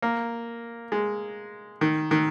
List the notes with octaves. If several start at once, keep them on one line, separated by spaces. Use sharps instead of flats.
A#3
G#3
D#3
D#3